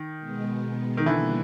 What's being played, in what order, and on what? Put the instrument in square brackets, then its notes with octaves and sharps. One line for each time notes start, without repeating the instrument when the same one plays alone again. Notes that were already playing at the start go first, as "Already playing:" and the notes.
Already playing: [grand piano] D#3
[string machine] B2 G#3 B3
[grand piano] D#3
[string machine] B2 G3 A#3 [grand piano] D3 E3